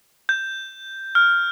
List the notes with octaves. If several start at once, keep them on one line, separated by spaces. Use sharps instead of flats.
G6
F6